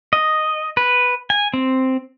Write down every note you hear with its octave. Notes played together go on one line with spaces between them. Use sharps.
D#5
B4
G#5
C4